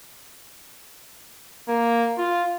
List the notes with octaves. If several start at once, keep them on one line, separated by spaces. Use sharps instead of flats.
A#3
F4